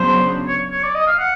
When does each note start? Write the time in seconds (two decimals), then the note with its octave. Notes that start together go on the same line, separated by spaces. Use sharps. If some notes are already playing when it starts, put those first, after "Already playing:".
Already playing: C#3 F#3 B3 D4 C5
0.48 C#5
0.71 C#5
0.83 D5
0.95 D#5
1.07 F5
1.19 F#5